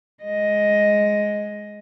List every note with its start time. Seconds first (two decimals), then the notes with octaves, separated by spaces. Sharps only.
0.23 G#3 D#5